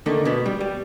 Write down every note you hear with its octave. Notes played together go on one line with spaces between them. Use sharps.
D3 D#3 A3 A#3
B2 B3
G3
G3